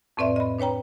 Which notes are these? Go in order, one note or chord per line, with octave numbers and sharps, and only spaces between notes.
F2 A2 C4 B4 D5 E5
D#5 B5
D4 B4 C#5 G5 A#5